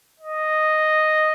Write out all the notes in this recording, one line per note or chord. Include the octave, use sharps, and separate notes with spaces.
D#5